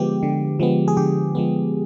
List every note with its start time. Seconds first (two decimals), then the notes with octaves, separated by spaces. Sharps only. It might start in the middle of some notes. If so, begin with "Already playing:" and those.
Already playing: D3 F3 G#3 B3 G4
0.23 D3
0.60 F3 G#3 B3
0.88 G#4
0.97 D3 G4
1.35 F3 G#3 B3